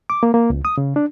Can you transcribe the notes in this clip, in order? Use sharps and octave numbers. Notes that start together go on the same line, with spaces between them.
D6
A#3
A#3
C#2
D#6
C#3
D4